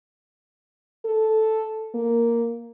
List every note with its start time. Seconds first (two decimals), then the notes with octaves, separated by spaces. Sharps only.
1.05 A4
1.95 A#3